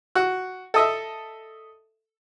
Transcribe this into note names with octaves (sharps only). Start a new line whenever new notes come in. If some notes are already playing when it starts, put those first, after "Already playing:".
F#4
A4 D#5 E5